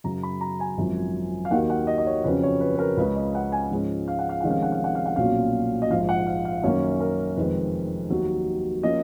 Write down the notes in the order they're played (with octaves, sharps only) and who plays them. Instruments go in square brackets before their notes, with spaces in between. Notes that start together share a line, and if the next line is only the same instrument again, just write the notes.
[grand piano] F#2 C#3 F#3 A#5
B5
A#5
G#5
G#1 F#2 F3
F5
D#2 D#3 F#3 A#3 F#5
F#5
D#5
D#5
C#5
F2 C#3 F#3 C#4 B4
C#5
B4
B4
A#4
C#2 C#3 G#3 C#4 B4
D#5
F#5
G#5
G#2 F3 G#3 C#4
F5
F#5
F5
F1 F2 D#3 G#3 C#4 F#5
F5
F#5
F5
F#5
F5
F#5
B1 A#2 F#3 A#3 C#4 F5
D#5
A#1 G#2 F3 F5
F#5
F5
F5
F#2 D#3 A#3 C#4 C#5
A#4
F1 F2 D#3 G#3 B4
F1 D#2 D#3 F#3 A#3
F3 A#3 C#4 D#5